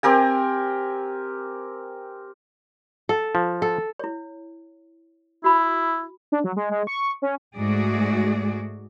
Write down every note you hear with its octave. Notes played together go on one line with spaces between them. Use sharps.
C4 G4 A#4 G#5
A4
F3
A4
E4 C#5
E4 F#4 B5
D4
F#3
G#3
G#3
C#6
C#4
G#2 G#3 A3 F#4 G#4 D5